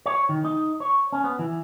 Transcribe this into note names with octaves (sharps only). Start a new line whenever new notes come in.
C#5
D#3
D#4
C#5
C#4
B3
E3